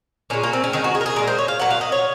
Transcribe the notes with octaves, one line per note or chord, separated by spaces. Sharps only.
A#2 G#3 C#4
A#3
C4
C#4
D#3 G#3 D#4
F#4
G#4
A#4
G#4
A#2 G#3 A#4
C5
C#5
F5
A#2 F#3 F#5
F5
D#5
C#5